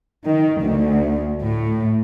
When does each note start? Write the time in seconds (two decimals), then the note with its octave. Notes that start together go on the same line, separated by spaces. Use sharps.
0.24 D#3
0.61 D2
1.40 A2